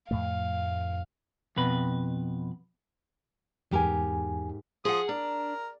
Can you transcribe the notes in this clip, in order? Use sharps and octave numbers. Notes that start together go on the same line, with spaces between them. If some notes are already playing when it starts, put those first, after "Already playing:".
F2 A2 A3 F5
F2 B2 B4
E2 G#2 G4 A#4 G#5
F3 G#4 F#5 D#6
D4 A#4